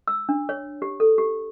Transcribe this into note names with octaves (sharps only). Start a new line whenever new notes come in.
E6
D4
C#5
G4
A4
G4